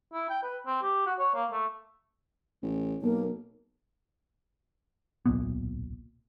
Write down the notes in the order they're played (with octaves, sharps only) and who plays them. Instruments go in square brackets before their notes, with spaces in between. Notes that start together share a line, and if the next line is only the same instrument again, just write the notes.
[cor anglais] E4
G5
B4
C4
G4
F#4
C#5
A#3
A3
[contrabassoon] A1
[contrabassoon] B1 [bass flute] A#3
[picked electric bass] D1 B1 A#2 B3